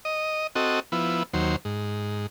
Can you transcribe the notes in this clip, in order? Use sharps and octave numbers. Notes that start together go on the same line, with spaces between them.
D#5
C4 F#4 A4 D#5
F3 B3 E4
D#2 F#3 C5
G#2